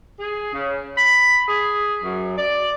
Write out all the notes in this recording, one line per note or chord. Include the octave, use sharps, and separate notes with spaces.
G#4
C#3
B5
G#4
F#2
D5